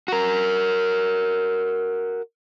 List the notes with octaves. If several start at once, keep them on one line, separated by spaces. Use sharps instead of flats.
F#4 A#4